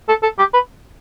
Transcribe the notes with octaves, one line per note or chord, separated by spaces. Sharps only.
A4
A4
G4
B4